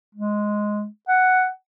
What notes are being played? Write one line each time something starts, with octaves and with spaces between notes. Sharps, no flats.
G#3
F#5